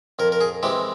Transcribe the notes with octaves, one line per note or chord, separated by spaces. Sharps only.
F2 A#4
A#4
G#4
E3 G#3 C4 G4